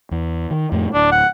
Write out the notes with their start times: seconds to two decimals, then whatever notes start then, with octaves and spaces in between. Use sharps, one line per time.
0.11 E2
0.50 D#3
0.72 F2 A2 A3
0.94 D1 D4
1.12 F#5